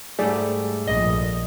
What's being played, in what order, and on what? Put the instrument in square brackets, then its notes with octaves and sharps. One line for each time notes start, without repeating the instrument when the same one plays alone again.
[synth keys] G#2 G3 A3 [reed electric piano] G#4 D5
[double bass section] A#1 [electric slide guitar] D#5